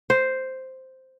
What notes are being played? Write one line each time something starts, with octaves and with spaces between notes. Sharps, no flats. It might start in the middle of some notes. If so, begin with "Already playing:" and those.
C5